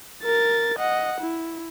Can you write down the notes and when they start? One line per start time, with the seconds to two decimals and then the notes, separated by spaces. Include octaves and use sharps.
0.24 A#4 A6
0.78 D#5 F#5
1.21 E4